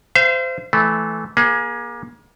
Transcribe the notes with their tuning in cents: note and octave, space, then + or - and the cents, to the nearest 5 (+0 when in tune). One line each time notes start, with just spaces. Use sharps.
C5 -20 F5 -45
E3 +0 A3 -20
A#3 +30 G#4 +0